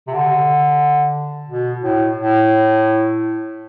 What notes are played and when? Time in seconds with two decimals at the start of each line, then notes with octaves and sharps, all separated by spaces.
0.07 C3
0.13 D3
1.49 B2
1.82 A2
2.17 A2